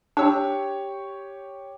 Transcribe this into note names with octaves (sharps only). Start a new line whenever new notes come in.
D4 G4 C#5 E6